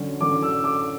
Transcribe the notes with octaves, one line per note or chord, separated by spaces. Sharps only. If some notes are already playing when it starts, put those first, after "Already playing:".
Already playing: D3 F#3 C#4
D3 F#3 C#4 D6
E6
D6